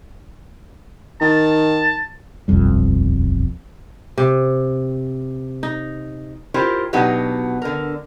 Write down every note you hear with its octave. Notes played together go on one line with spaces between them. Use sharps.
D#3 A5
D#1 B1 F2 G3
C3
D#4
E4 F4 G4 A#4 C5
B2 F#3 B3 D4 D#4 G4
D3 A#4